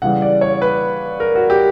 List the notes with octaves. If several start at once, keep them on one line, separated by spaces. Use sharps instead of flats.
C#3 E3 G3 F#5
D5
C#5
B4
A#4
F#4
G4